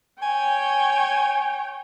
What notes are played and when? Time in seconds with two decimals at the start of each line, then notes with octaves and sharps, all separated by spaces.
0.22 C#5 G5 G#5